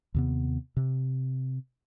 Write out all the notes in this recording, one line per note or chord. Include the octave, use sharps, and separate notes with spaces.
D#2 C3 B3
C3